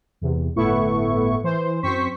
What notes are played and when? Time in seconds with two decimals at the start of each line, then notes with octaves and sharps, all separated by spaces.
0.21 E2 C3
0.56 G1 A2 A3 B3 E4 C#6
1.43 E3 C5
1.83 F#2 C4 C5 C#6 B6